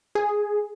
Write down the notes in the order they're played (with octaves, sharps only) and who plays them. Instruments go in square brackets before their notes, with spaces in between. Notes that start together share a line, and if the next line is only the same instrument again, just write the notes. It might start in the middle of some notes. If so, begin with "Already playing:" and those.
[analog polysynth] G#4